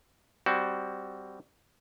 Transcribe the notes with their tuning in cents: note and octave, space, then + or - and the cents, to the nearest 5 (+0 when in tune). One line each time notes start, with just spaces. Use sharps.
G3 +0 C4 +0 F#4 +15